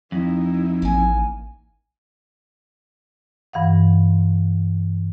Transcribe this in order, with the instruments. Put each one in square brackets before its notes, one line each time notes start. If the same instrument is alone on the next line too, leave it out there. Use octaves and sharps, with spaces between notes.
[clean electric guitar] F2 [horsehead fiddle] D#4 E4
[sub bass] A1 [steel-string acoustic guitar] A#3 G#5
[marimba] G2 E3 F5 F#5